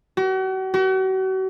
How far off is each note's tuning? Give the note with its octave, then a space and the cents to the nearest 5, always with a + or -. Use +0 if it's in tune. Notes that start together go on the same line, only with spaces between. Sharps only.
F#4 +40
F#4 +40